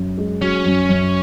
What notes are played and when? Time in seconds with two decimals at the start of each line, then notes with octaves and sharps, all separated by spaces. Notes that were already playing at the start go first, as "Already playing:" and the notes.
Already playing: F#2
0.17 G#3
0.41 F#3 C#4
0.65 F#2
0.89 F#2